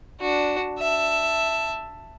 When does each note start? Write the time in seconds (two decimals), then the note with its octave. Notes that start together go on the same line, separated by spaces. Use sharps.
0.20 D4 F#4
0.79 E5 A5